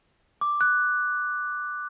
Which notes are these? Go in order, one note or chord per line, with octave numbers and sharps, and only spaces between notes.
D6
F#6